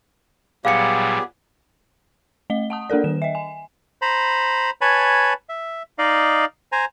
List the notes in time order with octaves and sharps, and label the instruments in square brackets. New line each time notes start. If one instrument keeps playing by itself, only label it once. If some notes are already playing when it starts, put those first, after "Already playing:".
[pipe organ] A#2 F#3 G3 [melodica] B3 G4 G#4 [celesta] F5 C#7
[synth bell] A3 D#5 G7
F#5 A5 D#6
A#3 D4 A4 A#4 D5
D#3 E7
D#5 E5
G#5
[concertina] C5 A#5 B5
B4 C#5 G#5 A5 B5
E5
D#4 D5 D#5 F5
C5 G#5 A#5